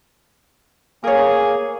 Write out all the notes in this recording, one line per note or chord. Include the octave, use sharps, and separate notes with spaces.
A#3 G#4 A#4 C#5